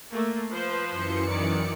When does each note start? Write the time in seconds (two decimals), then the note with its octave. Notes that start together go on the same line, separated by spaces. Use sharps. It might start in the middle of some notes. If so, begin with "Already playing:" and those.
0.11 A3 A#3
0.51 F3 B4 C5
0.90 F#2 E3 C#7
1.29 D#3 D5